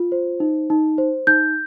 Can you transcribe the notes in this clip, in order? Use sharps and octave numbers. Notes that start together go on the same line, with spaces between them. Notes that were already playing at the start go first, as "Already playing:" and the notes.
Already playing: F4
C5
D#4
D#4
C5
D#4 G6